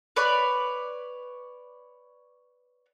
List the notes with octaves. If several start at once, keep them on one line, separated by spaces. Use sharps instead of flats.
B4 C#5 D5 B5